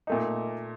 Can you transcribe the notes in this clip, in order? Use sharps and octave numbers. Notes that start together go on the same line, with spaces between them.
A#2 A3 D#4